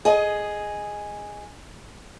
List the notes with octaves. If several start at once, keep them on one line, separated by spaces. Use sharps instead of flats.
G#4 D#5